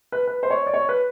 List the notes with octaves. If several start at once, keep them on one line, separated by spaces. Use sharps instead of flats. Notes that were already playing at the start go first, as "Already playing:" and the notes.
B4
B4
C5
C#5
D5
C#5
B4